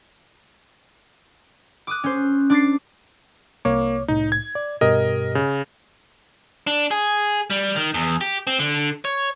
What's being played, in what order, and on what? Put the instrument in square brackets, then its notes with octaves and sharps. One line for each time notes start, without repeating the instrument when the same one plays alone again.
[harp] D6 D#6 F#6
C#4 C5
D4 D6 A6 C7
[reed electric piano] C2 C#5 D6 [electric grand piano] A#3
[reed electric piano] C2 A2 [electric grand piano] D#4
[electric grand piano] G#6
[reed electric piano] D5
[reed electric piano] G2 B2 G4 [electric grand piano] A#4 D#5
[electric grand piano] C#3
[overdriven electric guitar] D4
G#4
G3
D#3
E2
G4
C4
D3
C#5